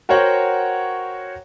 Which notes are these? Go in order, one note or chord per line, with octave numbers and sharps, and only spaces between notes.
F#4 A#4 C5 C#5 F#5 G5